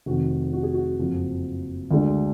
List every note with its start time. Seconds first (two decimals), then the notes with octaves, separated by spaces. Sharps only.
0.06 F1 F2 D#3 F#4
0.53 F#4
0.63 G#4
0.74 F#4
0.99 F#1 F2 F3
1.91 D2 D3 G#3 D4